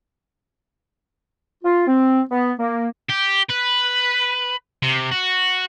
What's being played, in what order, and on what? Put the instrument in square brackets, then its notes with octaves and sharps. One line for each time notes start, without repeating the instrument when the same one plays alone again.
[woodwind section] F4
C4
B3
A#3
[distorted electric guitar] G4
B4
C3
F#4